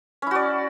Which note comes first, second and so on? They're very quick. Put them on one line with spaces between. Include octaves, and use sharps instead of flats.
C#4 E4 F#4 D5